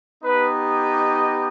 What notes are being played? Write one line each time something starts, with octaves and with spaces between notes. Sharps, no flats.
B3 D#4 G4 B4
D#5